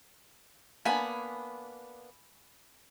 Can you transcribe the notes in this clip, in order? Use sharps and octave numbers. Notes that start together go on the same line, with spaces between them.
A#3 B3 D4 G#5 B5